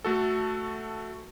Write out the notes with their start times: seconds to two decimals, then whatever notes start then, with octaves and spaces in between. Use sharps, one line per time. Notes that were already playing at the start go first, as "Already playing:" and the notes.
0.04 A3 F#4 A4